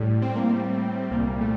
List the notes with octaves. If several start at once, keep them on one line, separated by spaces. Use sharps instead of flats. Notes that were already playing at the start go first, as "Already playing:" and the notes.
Already playing: A2 G3
C4
A#3
A2 G3 C4
C2 A#2 G3 A#3
A3